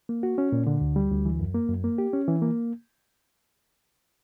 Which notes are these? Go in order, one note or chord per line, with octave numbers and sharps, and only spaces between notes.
A#3
F#4
C#4
A#2
D3
D2
G3
D2
E3
F#2
A#3
F#2
A#3
G4
C#4
E3
A#3